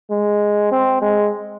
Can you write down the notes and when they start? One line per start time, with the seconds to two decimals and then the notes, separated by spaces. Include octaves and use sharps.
0.10 G#3
0.72 C4
1.02 G#3